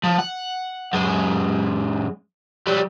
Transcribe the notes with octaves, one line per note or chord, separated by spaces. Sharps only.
F3
F#5
F#2 G#3
F#3 G3